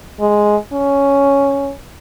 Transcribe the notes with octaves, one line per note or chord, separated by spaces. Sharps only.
G#3
C#4